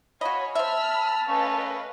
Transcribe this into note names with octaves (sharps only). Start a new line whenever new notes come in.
F#4 C#5 D#5 F5 G#5 B5
C5 E5 A5 B5 E6 F6
A3 C#4 B4 D#5 F5